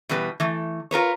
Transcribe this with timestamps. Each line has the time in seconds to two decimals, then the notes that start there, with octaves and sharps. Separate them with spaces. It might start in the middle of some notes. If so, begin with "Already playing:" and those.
0.09 B2 E3 G3 B4
0.40 E3 A3
0.91 F4 A#4 B4 C#5